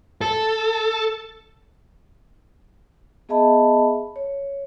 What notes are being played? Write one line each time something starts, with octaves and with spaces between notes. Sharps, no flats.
A4
B3 G#4 D#5 E5 A5 B5
C#5